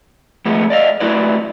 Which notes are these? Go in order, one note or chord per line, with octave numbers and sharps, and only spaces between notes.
F3 G#3 A3 B3
D5 D#5 F5
F#3 A3 E4 B4 D5